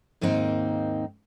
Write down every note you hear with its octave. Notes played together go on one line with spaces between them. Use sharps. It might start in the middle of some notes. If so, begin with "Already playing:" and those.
D#2 G#2 A#3 C4 D#4